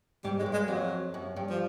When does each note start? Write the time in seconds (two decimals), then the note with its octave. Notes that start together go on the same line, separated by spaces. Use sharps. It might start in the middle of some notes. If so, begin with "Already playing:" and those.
0.24 G#2 G3
0.39 F#2 G#3
0.46 G2
0.53 G#3
0.68 F2 F#3
1.14 F#2
1.36 G2
1.50 F3